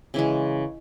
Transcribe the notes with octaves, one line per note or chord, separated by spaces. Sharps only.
C#3 E3 G#3